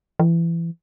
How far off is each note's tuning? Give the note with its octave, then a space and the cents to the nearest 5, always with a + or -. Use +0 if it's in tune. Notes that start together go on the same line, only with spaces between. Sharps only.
E3 +25